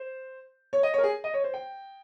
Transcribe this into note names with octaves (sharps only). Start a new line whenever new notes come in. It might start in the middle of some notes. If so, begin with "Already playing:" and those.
Already playing: C5
C#5
D#5
C#5
A#4
G#4
D#5
C#5
C5
G5